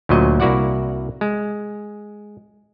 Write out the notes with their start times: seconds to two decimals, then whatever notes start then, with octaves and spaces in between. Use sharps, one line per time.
0.09 D2 A#2 F#3 D#5
0.40 C2 A#3 E4 F#4 D5 F#5
1.21 G#3